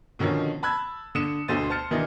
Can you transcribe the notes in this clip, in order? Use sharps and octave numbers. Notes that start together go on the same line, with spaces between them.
B2 D3 D#3 F3 C#4
A5 B5 E6 F#6 G#6
D3 D#6 C#7 E7
D2 B2 D3 C5 A6 D#7
C5 A5 F6 A6 C#7
B2 D#3 E3 D4 D#4